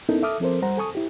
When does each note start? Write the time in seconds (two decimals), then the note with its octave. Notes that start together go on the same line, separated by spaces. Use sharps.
0.09 B3 C#4 D#4 E4 A4 A#4
0.22 A4 E5 A5 D6 D#6 F6
0.40 F3 C4 A4 A#4 C5
0.62 G3 C5 F#5 A#5
0.78 A4 G#5 A5 C#6 D#6
0.95 E4 G4